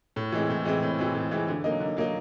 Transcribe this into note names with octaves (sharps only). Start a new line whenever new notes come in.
A2
E3 G#3 C4
A2
E3 G#3 C4
A2
E3 G#3 C4
A2
E3 G#3 C4
D3
F#3 A#3 D#4
D3
F#3 A#3 D#4